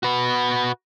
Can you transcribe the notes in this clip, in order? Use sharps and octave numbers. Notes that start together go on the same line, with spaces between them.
F#4 B4